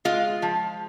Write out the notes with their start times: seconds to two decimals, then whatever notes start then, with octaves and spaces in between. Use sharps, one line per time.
0.05 G#3 F4
0.42 F3